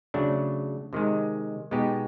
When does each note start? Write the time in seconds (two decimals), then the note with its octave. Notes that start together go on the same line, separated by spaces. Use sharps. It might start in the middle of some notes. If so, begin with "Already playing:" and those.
0.14 C#3 F#3 A3 D4
0.93 C3 D#3 G#3
1.71 B2 G#3 B3 D#4 G4